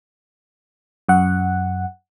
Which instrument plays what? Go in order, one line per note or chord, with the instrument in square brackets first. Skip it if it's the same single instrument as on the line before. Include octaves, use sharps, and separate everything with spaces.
[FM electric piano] F#2 F#5